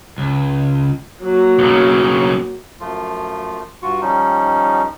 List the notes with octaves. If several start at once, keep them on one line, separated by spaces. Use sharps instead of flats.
C#2
F#3 A#3
B1 C#3
F#2 F3 A3 F4
G2 F4 F#4 C#6
D#3 F3 G3 C#4 D#4